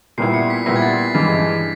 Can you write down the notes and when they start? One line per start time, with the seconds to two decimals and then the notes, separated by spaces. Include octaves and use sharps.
0.18 A#2 G3 B3 E4 C7
0.34 C#7
0.50 B6
0.66 A#2 G3 B3 E4 A#6
0.76 G#6
0.82 A6
0.98 B6
1.14 G2 E3 G#3 B6